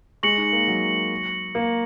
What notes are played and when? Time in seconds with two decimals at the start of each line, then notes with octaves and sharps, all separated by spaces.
0.23 G#3 C#6 A#6 C#7 F#7
0.38 D#4
0.53 A#3
0.68 F#3
1.55 A#3